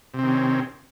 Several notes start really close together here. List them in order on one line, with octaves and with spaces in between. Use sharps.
C3 C4 D#3 C#4